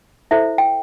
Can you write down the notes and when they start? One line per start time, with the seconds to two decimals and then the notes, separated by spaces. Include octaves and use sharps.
0.31 E4 A4 C5 E5
0.58 G5